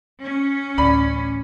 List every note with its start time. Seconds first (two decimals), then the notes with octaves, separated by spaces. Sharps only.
0.22 C#4
0.78 A1 D2 D5 B5